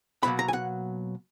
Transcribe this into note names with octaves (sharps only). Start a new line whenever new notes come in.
B2 F#3 A#3 B5
A#5
G#5
F#5